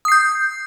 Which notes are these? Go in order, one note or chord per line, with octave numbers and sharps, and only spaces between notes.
D#6 G6 C7